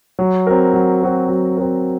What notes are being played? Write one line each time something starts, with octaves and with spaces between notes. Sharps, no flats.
F#3
C4 F#4 A#4
F#3
C4 F#4 A#4
F#3
C4 F#4 A#4